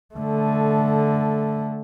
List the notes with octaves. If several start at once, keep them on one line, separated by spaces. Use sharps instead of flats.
D3 A3